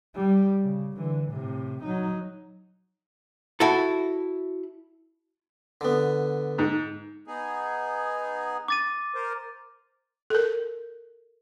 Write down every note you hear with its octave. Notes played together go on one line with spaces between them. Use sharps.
G3
C#3
D3 E3
A2 C3
F#3 D#4
E4 F#4 A4
D3 B3
G#2
B3 D#4 G#4
D6 A6 D#7
A#4 C5
A4 A#4